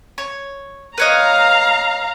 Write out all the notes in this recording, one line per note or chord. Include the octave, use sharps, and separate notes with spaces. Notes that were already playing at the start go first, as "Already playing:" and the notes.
C#5
B4 C#5 D#5 F5 A#5